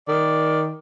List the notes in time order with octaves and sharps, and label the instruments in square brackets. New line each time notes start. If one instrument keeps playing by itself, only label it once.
[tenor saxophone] D#3 [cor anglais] D5